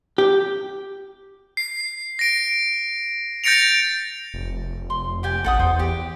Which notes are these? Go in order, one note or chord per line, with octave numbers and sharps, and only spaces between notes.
G4
C7
A#6 D7
G6 A6 A#6 C#7 D7 F7
F1
C6
G4 G5 G#5
A1 A4 F#5 D#6
E2 C5
G4